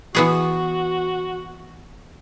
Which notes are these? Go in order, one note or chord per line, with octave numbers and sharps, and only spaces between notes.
E3 B3 F#4 G#4